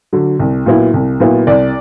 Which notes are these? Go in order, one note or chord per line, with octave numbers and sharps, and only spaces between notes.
D3 F#3
C2
A#2 F#3 B3 E4
C2
A#2 F#3 B3 E4
C2 D5